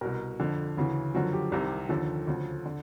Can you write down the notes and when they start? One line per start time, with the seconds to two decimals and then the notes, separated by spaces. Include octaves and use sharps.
0.01 C2 B2 A#4
0.40 F2 D3 F3
0.77 D2 C#3 E3
1.15 F#2 D3 F3 F#4
1.33 G4
1.52 C2 C3 D#3
1.89 D#2 D3 F3 A4
2.27 D2 C#3 F3
2.66 D3